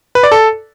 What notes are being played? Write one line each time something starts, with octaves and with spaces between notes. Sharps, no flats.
B4
D5
A4